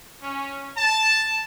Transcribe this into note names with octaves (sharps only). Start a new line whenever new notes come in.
C#4
A5